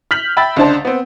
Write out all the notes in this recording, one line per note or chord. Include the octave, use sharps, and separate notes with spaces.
F6 G6 B6 F#7
E5 G5 B5 E6 A6
C#2 D3 D4 C5 A5
B3 C4